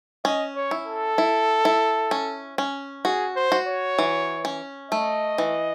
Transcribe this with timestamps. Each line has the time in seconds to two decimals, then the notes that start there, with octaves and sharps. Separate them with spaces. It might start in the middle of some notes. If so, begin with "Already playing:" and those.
0.24 C#4 D#5
0.56 C#5
0.71 E4
0.87 A4
1.18 E4
1.65 E4
2.11 C#4
2.58 C#4
3.05 F#4 G#4
3.36 C5
3.52 F#4
3.68 C#5
3.99 E3
4.45 C#4
4.91 A3 D#5
5.38 E3